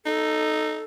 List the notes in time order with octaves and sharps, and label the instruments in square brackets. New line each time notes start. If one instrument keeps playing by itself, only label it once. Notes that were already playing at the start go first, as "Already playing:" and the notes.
[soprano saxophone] D#4 [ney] A4